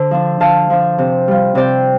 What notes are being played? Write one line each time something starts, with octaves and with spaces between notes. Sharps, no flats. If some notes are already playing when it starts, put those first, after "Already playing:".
Already playing: D3 C5
F3 D4
D3 F5 A5
F3 D4
C3
G3 F4
C3 D5 G5